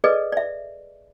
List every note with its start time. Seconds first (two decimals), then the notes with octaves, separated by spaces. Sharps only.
0.04 G#4 A4 B4 D5 D#5
0.32 D5 E5